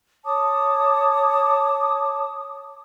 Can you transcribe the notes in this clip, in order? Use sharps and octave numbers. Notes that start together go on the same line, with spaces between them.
C#5 A5 D6 D#6